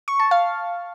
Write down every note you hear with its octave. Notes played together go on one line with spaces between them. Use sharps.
C#6
A5
F5